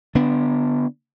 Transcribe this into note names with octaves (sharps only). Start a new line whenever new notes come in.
D3 B3 D4